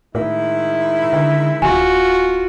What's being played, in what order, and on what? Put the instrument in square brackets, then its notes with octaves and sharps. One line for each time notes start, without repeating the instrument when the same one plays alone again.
[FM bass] A2 [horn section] D#3 G#3 E4
[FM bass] D3
[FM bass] D1 [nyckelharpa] F4 F#4 [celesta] G#5